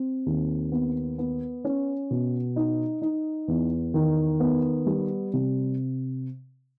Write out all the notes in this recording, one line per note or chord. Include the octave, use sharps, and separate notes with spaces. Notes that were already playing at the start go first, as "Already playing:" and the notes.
Already playing: C4
D#2
B3
B3
C#4
B2
D#4
D#4
E2
D#3
B3
G3
C3